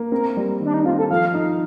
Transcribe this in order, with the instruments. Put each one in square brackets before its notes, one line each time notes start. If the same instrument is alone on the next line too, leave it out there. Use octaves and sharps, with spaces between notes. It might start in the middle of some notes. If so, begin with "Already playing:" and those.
Already playing: [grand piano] A#3
[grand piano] C4 [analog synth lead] A#4
[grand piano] G3
[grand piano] D#3 [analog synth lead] D4
[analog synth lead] D#4
[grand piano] C4 [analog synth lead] F4
[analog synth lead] A4
[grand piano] F3 [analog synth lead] F5
[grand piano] D#4